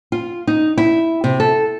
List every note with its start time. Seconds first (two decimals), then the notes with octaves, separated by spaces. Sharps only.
0.12 F4
0.47 D#4
0.78 E4
1.24 C3
1.40 A4